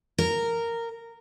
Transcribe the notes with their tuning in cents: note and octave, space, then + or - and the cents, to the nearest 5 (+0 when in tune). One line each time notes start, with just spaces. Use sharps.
A#4 -10